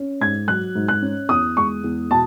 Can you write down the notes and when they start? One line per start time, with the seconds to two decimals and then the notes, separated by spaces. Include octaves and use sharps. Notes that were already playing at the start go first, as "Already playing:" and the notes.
Already playing: C#4
0.21 G#2 G#6
0.47 F#3 F#6
0.75 G#2
0.88 F#6
1.02 C#4
1.29 E2 D#6
1.56 G#3 C#6
1.84 E2
2.11 B2 A5